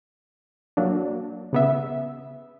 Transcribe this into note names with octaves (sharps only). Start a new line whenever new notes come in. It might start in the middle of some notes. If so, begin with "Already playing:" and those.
F#3 A#3 D4
C#3 B3 E5